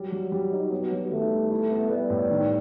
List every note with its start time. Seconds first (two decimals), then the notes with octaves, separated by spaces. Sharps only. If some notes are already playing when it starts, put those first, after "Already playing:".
Already playing: F#3 G3
0.12 G3
0.32 G3
0.52 D#4
0.72 B3
0.92 G3
1.11 D#3 A3
1.31 G3
1.51 E4
1.71 B3
1.90 G3 B3
2.10 A2
2.30 D#3